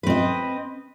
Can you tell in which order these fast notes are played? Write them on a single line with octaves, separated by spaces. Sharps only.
B4 C4 D#5